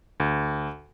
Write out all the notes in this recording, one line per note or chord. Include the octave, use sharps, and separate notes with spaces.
D2